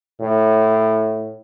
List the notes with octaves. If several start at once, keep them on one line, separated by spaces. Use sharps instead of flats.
A2